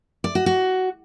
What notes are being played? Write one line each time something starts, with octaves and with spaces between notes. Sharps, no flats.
D5
F#4
F#4